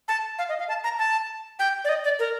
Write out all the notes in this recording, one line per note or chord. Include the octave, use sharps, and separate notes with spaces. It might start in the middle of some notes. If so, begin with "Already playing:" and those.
A5
F5
D#5
F5
A5
A#5
A5
G5
D5
D#5
D5
A#4